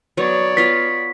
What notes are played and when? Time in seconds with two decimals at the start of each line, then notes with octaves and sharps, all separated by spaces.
0.17 F#3 B3 C#5 D5
0.57 B3 F4 F5 B6